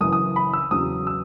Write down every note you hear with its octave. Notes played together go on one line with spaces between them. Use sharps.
F#1 F#2 E3 D#6
D#6
B5
E6
E2 C#3 F#3 D#6
E6